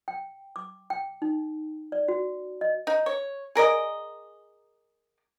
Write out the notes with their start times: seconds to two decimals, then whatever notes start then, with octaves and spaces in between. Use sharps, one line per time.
0.08 G5
0.56 D6
0.90 G5
1.22 D#4
1.92 D5
2.08 F#4
2.61 D#5
2.87 D#4
3.06 C#5
3.55 G#4 A#4 D5 D#5